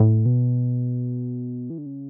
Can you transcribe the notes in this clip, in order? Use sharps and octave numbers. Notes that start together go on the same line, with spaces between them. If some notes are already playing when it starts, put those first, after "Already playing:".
Already playing: A2
B2
E3
D3
C#3